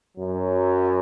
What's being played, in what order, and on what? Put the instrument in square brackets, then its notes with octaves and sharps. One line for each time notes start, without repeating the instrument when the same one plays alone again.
[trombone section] F#2 F#3